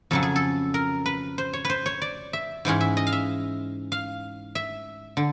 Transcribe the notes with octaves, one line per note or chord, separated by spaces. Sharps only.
F2 C#3 F#3 A4
G#4
A4
A#4
B4
C5
C#5
B4 C5
C#5
D5
E5
G#2 E3 G#3 C#4
E5
D#5
F5
E5
F5
E5
D3